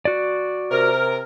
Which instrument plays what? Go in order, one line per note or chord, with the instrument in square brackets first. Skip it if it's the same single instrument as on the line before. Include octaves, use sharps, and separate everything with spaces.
[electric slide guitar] F#4 D5
[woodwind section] C3 [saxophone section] A#4